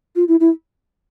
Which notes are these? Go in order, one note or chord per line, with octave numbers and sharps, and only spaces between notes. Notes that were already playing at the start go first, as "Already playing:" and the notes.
F4
E4
E4